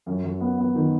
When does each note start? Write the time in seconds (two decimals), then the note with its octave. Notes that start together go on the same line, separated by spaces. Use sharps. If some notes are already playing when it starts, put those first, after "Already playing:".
0.06 F#2
0.23 F#2
0.41 B3
0.58 B3
0.75 D#3